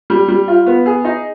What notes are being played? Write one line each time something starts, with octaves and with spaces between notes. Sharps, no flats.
G3
G3
F4
B3
G#4
D#4